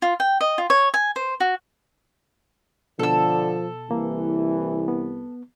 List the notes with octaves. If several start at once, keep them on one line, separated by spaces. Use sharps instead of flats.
F4
G5
D#5
F4
C#5
G#5
C5
F#4
B2 D3 F3 A4 E6
C2 E3 A#3
B3